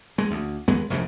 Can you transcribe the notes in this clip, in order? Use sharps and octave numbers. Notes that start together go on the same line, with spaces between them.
G#3
D2
D#2 G#3 B3
F1 A#1 A#2 C#3